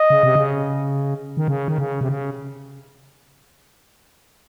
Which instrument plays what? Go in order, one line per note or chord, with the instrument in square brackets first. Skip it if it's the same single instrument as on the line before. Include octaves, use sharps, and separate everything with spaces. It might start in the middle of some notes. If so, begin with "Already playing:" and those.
Already playing: [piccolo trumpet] D#5
[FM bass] C#3
C3
C#3
D#3
C#3
D#3
C#3
C3
C#3